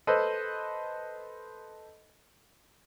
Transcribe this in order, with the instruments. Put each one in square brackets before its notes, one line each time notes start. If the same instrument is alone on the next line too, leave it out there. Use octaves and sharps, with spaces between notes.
[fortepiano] A4 B4 C5 D#5